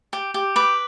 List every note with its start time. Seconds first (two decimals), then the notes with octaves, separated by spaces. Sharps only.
0.13 G4
0.34 G4
0.56 B4 D6